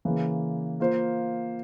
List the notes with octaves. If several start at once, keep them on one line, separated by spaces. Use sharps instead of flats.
C#3 E3 A#3
A#3 F4 C5